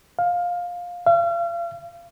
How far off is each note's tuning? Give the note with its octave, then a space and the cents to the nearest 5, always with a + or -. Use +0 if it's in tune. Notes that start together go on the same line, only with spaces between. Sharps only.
F5 +15
F5 -40